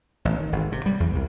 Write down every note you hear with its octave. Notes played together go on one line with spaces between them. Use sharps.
A1
D#3
G#1
C3
G3
E2
C2